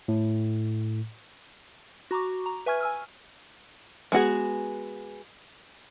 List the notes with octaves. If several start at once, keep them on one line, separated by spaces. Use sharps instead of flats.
A2
F#4 A#5 C#6 D6
A#5
B4 E5 G#5 C#6 F6 G#6
G#5 E6 F6
G#3 B3 F#4 G#4